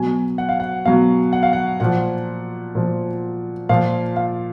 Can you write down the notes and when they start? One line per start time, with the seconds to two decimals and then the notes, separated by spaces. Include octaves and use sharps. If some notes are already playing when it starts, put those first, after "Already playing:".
Already playing: B2 F#3 G#5
0.38 F#5
0.49 F5
0.60 F#5
0.85 B2 F#3 F5
1.33 F#5
1.43 F5
1.53 F#5
1.80 A#2 F3 F#5
2.75 A#2 F3
3.69 A#2 F3 F5
4.16 F5